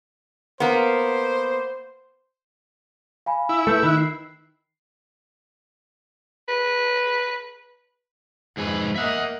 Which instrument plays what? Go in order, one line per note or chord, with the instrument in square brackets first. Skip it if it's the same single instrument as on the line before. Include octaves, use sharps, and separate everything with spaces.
[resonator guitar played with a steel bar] A#3 B3 [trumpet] C5
[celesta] F5 G#5 B5
[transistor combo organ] E4
[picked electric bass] A3 [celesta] B4 G6 C#7
[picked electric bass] D#3 [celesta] B5 F#6
[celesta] C7
[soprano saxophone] B4
[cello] F2 [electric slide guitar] G#2 G#4 B4
[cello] A#3 D#5 [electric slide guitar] E5 F#5